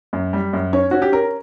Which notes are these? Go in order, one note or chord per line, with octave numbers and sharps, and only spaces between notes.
F#2
G3
F#2
C#4 C#5
C#4 F#4
G4
C#4 A#4